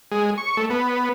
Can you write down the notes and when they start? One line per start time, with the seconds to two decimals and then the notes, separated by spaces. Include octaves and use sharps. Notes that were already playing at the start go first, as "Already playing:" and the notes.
0.11 G#3
0.38 C#6
0.57 A3
0.70 B3